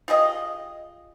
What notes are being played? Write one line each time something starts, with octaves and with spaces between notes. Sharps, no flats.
F4 G4 G#4 D#5